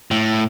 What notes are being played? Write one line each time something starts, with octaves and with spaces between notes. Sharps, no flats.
A2